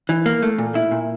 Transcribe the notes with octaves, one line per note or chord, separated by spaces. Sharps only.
E3
A#3
A3
A#2
E4
A#2